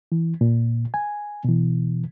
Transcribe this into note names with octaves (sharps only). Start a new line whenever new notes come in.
E3
A#2
G#5
B2 E3